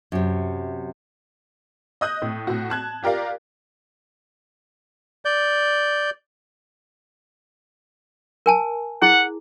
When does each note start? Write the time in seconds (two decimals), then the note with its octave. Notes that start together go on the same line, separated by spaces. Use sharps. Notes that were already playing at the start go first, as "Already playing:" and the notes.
0.12 F#2 C3
2.01 D#5 D#6 F#6 G6
2.22 A2
2.47 A2 F#4
2.70 A5 F#6 G#6
3.03 F4 G4 A#4 D5 F5
5.25 D5 G6
8.46 A#4 G#5 A5
9.02 E4 G#4 F#5